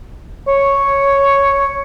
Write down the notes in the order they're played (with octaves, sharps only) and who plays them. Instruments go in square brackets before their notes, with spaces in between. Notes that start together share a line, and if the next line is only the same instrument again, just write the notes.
[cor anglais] C#5